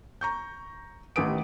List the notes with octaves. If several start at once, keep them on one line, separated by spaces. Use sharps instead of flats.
A#5 C#6 G6
A1 D#3 G4 B4 D#6 D7